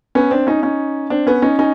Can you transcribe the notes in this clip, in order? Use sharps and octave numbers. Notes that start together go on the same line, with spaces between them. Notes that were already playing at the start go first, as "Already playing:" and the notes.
B3 C#4
C4 D4
C#4 D#4
C#4 D#4
C4 D4
B3 C#4
C#4 D#4
C#4 D#4